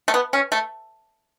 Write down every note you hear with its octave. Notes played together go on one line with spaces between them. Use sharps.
A3
B3
C#4
A3